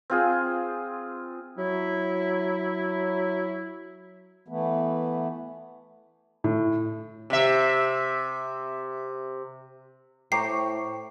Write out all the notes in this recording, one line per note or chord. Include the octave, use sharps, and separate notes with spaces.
C4 F4 G#4
F#3 E4
E3 A3 B3
A2
C3 E5
A2 C5 G5 A#5 C#6 D6 C7